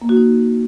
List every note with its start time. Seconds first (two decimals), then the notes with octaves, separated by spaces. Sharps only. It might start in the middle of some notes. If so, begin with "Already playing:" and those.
0.02 A#3
0.09 F#4
0.17 D#4